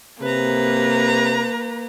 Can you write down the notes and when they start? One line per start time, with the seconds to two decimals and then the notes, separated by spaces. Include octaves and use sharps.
0.22 C3 A#3 B4 A#5